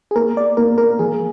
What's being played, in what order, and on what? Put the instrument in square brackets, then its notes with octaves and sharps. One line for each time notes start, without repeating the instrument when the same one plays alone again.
[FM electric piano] G#4
[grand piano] A#3 [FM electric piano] A#4
[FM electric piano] D5
[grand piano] A#3 [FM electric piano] A#4
[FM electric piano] A#4
[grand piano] F3 [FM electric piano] G#4